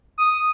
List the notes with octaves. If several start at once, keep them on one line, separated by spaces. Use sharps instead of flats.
D#6